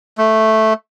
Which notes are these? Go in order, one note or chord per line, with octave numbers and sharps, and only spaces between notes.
A3